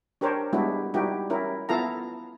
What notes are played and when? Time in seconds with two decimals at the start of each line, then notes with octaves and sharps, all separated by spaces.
0.21 D4 G4 A#4 C5 C#5
0.53 G3 G#3 B3 D4 E4 F#4
0.94 G3 D#4 E4 F#4 G4
1.30 C#4 E4 A#4
1.69 B3 E4 F4 A4 F5 A#5